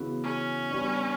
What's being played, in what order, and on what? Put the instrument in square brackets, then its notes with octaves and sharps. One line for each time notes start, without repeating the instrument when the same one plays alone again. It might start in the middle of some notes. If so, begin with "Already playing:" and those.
Already playing: [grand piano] C#3 E3 B3 F#4
[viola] C#4
[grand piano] G3 B3 D4